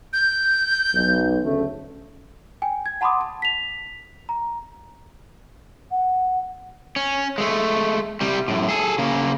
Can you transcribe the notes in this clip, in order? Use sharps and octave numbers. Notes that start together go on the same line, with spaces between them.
G6
B1
D2 C#3 A3
G5 G#5
G#6
F#5 A5 B5 C6 D6 D#6
A5
B6 F7
A#5
F#5
C#4
G#3 A3
C3 G3
F#2 A2
G#4 A4
C#3 A#3